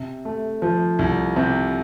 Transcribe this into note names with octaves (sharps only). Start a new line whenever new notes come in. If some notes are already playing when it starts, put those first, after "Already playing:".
Already playing: C3
A3
F3
C2
C3